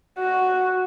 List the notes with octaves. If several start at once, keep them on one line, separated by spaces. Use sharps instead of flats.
F#4